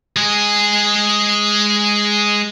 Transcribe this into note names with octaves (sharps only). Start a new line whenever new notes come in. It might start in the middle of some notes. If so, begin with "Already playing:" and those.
G#3 G#4